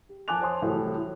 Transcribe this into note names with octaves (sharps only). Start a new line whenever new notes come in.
G4
F2 G#5 A5 D6 F#6 F7
C5 C#5 G#5 A5 C6 D#6
C2 A2 E3 F#3 A3
E4